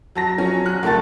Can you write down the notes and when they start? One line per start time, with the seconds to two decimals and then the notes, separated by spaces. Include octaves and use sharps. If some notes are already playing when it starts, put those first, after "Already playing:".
0.15 F#3 A5 A#6
0.38 F3 F#3 C#4
0.66 F#3 F#6
0.83 C#2 A3 A#4 A5 A6